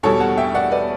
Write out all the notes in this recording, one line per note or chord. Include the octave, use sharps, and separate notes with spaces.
E2 B2 G3 A4 C#5
F#5 A5
E5 G5
D5 F#5
B4 D5